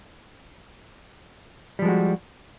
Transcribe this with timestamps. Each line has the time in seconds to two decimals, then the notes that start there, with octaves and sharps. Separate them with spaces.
1.79 G3
1.82 F3
1.85 G#3
1.88 F#4